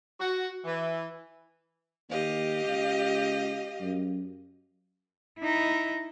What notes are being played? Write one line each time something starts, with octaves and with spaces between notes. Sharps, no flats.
F#4
E3
D#2 G4 D#5 F5
C#2
F#2
D#4 E4